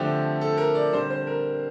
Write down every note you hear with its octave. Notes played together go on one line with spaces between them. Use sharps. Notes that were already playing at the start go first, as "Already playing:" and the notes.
Already playing: D3 F3 A3 C4 G4
A4
A#4
D5
D3 G3 C4 C5
C5
A#4